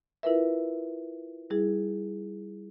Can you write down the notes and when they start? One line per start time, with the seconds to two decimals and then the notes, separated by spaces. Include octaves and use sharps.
0.23 E4 F4 A#4 B4 E5
1.50 G3 E4 G#4